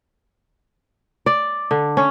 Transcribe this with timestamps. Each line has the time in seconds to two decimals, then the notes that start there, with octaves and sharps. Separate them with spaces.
1.26 D5
1.71 D3
1.97 C#4